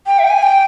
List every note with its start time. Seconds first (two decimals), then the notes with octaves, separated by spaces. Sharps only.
0.06 G5
0.19 E5
0.24 G5
0.30 G#5
0.43 G5